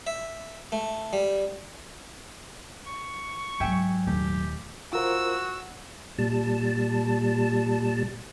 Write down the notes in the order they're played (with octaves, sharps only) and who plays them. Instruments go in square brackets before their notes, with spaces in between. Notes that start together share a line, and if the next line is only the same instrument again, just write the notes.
[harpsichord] E5
A3
G3
[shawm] C#6
[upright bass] G#2 F#3 [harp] E5 G5 G#5
[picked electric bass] D#1 D#3 A3 [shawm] G4
[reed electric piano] F4 A#4 C5 [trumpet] F#4 [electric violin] E6
[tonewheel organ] A#2 G3 A5